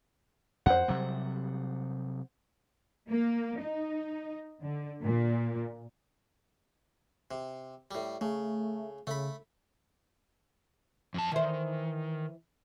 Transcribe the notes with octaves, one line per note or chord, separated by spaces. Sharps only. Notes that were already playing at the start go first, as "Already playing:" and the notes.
F2 C5 F#5
C3 F#3 G3
A#3
D#4
D3
A#2
C3
A2 G3
C#3 A3
C#3 A3 B5
F2 A5
D#3 E3 C5